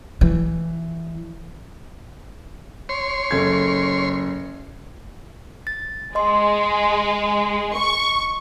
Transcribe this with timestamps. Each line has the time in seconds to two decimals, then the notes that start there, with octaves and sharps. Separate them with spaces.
0.21 E3
2.89 C#5 C6
3.31 F#1 A4 G#6
5.67 A6
6.15 G#3 D#5 C6
7.75 C#6